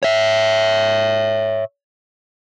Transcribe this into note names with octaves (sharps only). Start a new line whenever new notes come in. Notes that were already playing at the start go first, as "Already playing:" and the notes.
C#5 E5